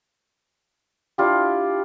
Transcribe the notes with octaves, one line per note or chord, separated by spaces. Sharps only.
D4 E4 F4 G4